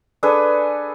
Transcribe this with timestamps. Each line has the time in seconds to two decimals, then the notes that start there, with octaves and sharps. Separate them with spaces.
0.23 D4 G#4 A4 B4